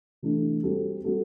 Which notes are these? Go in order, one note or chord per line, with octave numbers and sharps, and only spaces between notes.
C3 E3 A3 D4
G3 C4 F#4 A4
G3 C4 F#4 A4